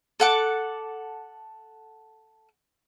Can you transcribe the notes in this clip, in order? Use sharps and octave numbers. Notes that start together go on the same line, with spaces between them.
A4 F#5 D6